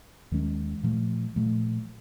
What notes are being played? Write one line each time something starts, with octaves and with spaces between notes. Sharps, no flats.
D#2 D#3 G#3 C#4
A#2 F3 A3
A#2 F3 A3